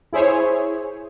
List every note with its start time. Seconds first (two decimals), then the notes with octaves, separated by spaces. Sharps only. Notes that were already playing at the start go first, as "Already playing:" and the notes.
0.13 E4 G#4 C5 C#5